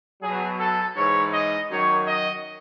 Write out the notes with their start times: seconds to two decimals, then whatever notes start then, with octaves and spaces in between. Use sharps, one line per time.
0.21 B2 F#3 G#4
0.59 A4
0.96 G#2 E3 C#5
1.33 D#5
1.70 F#2 D#3 F#3 C#5
2.07 D#5